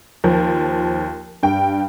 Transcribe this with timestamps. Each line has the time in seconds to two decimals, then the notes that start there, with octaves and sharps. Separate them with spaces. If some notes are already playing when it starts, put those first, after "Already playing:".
0.24 D#2 F3
1.43 G2 G5